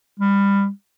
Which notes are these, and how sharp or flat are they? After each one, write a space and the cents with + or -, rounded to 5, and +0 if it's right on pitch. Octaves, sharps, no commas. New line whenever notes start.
G3 +25